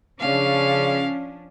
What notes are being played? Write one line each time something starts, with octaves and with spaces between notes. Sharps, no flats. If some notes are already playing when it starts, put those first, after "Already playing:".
C#3 F3 C#4 D4 F5